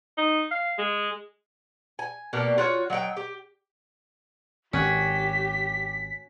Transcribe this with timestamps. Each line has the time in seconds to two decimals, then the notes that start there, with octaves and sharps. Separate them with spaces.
0.17 D#4
0.51 F5
0.78 G#3
1.99 G#5
2.33 B2 A#3 D4 G4
2.58 F4 F#4 C#5
2.90 F#3 D#5 F#5 G5
3.17 G4
4.73 G#1 C#4 F#4 G4 B6